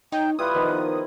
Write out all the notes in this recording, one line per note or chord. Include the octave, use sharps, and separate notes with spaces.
D#4 C#5 G5
G3 E4 F4 B4 D#6
D#3 F3 B3